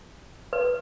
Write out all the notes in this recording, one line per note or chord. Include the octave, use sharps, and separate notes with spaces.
B4